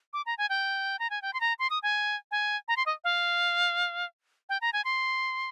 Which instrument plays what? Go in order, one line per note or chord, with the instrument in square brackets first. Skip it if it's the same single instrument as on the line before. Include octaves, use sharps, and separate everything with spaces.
[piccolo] D6
A#5
G#5
G5
A#5
G#5
G5
C6
A#5
C6
D#6
G#5
G#5
A#5
C6
D#5
F5
G5
A#5
G#5
C6